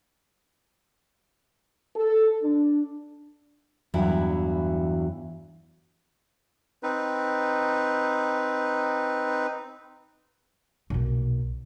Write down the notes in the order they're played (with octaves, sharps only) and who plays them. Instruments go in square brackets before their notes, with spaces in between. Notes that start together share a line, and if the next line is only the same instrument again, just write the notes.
[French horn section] A4
D4
[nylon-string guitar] E2 G2 E3 F#3 E4
[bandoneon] C4 D#4 B4
[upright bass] B1 A#2